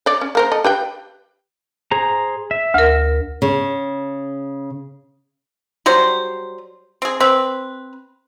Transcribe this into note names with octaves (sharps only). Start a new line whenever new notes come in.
C#5 D5
C#4
A#3 A#4 C5
A4 D#5
G4 B4 G5
G#4 C5 A#5
E5
D2 A#4
C#3
F#3 G3 C5
C4 G#4
C4 B4